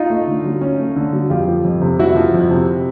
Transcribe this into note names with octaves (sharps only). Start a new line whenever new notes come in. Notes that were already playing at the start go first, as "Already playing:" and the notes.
Already playing: D#4 F4
A3
D3
F#3
C#4
A3
D3
F#3
F2 F4 G4
F3
F2
C3
F2 E4 F#4
F3
F2
C3